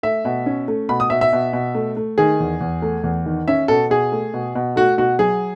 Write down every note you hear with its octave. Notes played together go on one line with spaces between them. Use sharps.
A3 E5
B2
C#4
A3
B2 B5
D#6
B2 E5
E5
B2
B2
A3
A3
D#3 G#4
E2
E2
A3
E2
D#3
C#4 E5
B2 A4
B2 G#4
A3
B2
B2
A3 F#4
B2 F#4
F#3 G#4